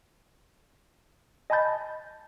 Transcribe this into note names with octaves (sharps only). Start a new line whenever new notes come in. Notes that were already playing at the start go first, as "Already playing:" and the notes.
D#5 G#5 A5 B5 G6 A6